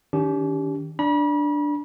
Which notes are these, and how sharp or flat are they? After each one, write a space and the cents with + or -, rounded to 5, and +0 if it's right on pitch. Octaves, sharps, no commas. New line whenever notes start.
D#3 +0 C#4 +45 G4 +0
D4 +0 B5 -40